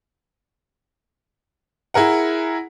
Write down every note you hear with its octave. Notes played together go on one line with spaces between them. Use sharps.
E4 G#4 A#4 F#5